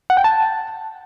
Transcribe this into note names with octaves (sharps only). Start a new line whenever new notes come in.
F#5
G5
A5